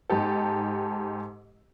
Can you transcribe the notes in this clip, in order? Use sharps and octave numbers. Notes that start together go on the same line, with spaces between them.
G#2 D#4 G4 A4